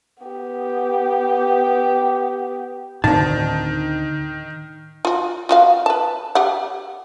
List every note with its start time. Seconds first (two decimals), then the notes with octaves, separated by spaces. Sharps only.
0.23 B3 G4
3.04 D2 A2 D#3 C4 A5
5.05 F4 F#4
5.49 F4 F#4 F5
5.86 B4 A5
6.35 G4 F5 F#5